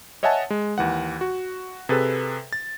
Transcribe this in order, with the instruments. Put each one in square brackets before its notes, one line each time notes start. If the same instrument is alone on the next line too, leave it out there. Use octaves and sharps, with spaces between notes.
[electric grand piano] C#5 D#5 E5 F#5 G#5 A5
G#3
D#2 E3 F#5
F#4
C3 G#4 A4 B4
A6